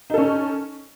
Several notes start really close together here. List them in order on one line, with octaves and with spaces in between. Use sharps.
D#4 A4 C#4